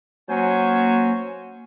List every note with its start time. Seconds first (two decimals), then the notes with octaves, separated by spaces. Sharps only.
0.29 F#3 A#3 C#4 C5 G#5